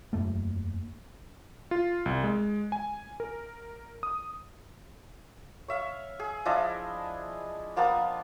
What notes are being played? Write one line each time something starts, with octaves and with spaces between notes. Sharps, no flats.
E1 F#2 A3 A#3
F4
C2
G#3
G#5
A#4
D#6
C#5 E5 F5
G#4
F3 D4 E4 D#5
F3 A#3 B3 A5